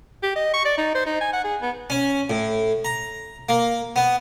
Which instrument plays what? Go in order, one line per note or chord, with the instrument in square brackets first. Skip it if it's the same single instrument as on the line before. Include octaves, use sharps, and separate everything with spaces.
[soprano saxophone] G4
D#5
C#6
D5
D#4
C5
D#4
G#5
F#5
G#4
B3
[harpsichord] C#4
A2
A#5
A#3
B3